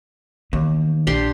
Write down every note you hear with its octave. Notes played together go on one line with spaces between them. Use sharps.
D#2 E3 B3
A#1 D4 G4 C6